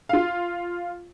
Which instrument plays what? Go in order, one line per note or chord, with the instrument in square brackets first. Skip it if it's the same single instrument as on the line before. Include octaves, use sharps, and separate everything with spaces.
[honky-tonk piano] F4 F5